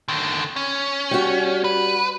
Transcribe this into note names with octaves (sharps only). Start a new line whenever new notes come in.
D3 D#3
C#4
G3 F#4
B4